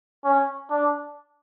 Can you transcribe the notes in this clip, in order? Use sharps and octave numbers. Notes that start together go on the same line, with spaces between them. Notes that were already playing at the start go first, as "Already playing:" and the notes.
C#4
D4